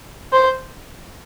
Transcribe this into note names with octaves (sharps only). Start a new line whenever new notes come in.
C5